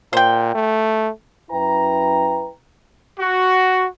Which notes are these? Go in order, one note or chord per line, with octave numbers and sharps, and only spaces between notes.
A#2 C5 G5
A3
F#2 E4 B4 G5 A#5
F#4